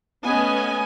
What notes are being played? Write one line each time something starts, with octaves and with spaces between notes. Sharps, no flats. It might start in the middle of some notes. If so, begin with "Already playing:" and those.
A3 B3 C#4 D#5 G#5